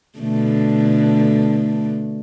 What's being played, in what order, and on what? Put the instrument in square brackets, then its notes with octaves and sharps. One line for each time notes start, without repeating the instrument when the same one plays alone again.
[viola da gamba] B2 D3 A3